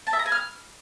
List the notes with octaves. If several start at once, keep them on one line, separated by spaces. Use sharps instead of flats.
A5
E5
A#5
G#5
F6